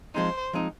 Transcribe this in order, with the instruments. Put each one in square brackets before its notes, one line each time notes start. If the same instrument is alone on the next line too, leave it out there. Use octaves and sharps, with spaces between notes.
[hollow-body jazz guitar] F3 G#3 C4 D#4 [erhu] C5
[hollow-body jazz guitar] F3 G#3 C4 D#4